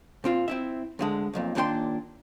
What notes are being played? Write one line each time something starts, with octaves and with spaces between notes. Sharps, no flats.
A#2 C4 F4
C4 E4 E5
D2 D3 G#3
B1 F2 A#2
D#2 A#2 D4 A#4 G5 C6